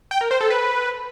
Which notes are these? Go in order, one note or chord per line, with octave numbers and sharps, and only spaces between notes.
G5
A#4
C5
A4
B4